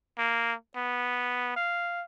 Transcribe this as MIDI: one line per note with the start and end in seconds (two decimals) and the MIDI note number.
0.18 0.53 58
0.76 1.56 59
1.56 2.03 77